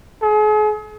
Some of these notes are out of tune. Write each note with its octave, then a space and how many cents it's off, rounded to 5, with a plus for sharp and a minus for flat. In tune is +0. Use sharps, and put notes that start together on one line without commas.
G#4 +40